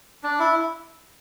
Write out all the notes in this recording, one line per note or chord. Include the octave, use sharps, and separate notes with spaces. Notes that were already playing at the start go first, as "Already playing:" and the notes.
D4
E4